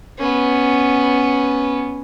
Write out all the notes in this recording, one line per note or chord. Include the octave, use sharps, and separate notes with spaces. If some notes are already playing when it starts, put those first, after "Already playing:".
B3 C#4